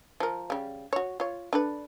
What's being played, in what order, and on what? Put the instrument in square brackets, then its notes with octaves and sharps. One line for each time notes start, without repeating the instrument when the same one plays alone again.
[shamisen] F3 A#4
C#3 G3
F#4 C#5
F4 C#5
D4 A4 B4